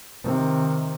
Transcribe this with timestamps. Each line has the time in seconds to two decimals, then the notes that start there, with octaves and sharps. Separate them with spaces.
0.24 C3 D#3